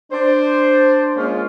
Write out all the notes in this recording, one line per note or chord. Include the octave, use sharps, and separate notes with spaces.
D4 C5
G#3 A#3 C#4 F4